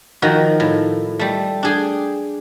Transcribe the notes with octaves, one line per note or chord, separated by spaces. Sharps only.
D#3 F3 F#4
A2
G3 A3
D4 G#4 G5